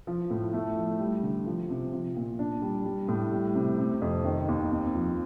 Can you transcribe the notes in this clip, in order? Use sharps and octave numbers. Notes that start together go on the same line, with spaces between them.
F3
A2
A3
F3
G3
D3
F3
C3
F3
A#2
D4
G3
G3
A2
G3
C3
C3
F2
D#3
D#2
C4
F3